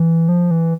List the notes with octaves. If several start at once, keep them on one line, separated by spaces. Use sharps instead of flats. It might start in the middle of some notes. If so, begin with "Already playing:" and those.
Already playing: E3
F3
E3